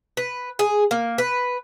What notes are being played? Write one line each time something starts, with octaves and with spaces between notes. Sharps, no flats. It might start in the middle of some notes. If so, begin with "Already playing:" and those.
B4
G#4
A#3
B4